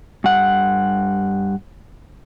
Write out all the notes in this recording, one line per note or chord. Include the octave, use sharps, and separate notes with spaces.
G2 F#5